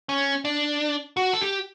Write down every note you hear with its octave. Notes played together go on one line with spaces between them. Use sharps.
C#4
D4
F#4
A4
G4